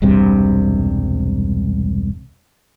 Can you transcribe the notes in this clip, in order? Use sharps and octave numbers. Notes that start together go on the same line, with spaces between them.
E1 C2 G2 C3